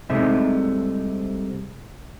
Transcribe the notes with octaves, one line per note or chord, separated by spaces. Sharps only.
C2 C3 G#3 A3 D#4 E5